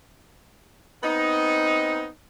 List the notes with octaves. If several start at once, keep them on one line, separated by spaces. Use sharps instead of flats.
B3 C4 D#4